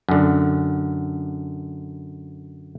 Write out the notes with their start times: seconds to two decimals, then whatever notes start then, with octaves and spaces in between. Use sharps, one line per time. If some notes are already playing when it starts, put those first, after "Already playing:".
0.09 F#2 D3